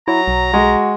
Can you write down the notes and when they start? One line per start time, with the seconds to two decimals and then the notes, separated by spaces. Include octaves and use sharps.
0.08 F#3 E4 A#5
0.28 B1
0.53 G#3 F#4